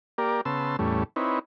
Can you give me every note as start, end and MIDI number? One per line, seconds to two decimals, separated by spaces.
0.18 0.41 58
0.18 0.41 67
0.18 0.41 70
0.18 0.41 74
0.45 0.76 49
0.45 0.76 59
0.45 0.76 81
0.45 0.76 84
0.45 0.76 88
0.79 1.04 40
0.79 1.04 45
0.79 1.04 55
0.79 1.04 57
0.79 1.04 61
1.16 1.39 60
1.16 1.39 63
1.16 1.39 64
1.16 1.39 71
1.16 1.39 73